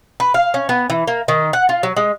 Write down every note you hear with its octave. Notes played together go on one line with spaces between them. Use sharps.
B4
F5
C#4
B3
E3
A#3
D#3
F#5
F4
F#3
G#3